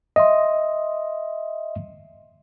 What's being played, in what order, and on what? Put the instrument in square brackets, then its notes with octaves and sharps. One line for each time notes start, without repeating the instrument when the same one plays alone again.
[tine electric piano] D#5 E5 C6